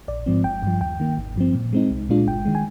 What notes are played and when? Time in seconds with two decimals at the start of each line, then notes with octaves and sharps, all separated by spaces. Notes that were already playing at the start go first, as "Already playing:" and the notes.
0.08 A#1 D5
0.26 G#2 F3 C4
0.44 G1 G5
0.62 G2 F3
0.81 D#2 G5
1.00 D#3 A#3
1.18 G#1
1.36 G2 F3 C4
1.55 A#2
1.73 G#3 C4 D#4
1.91 C2
2.09 A#2 G#3 D4 F4
2.27 G1 G5
2.45 D#3 G#3
2.55 G#5